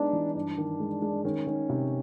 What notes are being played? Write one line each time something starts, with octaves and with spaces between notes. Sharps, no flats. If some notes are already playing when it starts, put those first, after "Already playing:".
Already playing: G#3 B3 D4 D#4
E3
G2 D4
D#3
G#3
G#3
D#3 C#4
D#3
C3